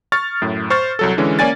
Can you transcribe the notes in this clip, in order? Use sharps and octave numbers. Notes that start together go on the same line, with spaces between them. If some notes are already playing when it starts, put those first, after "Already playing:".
C#6 F6 A6
F#2 A2
C5 C#6 F6 A6
C2 F#3 A4
D3 E3 G#3 C#4
A#3 C#4 D5 G#5 A6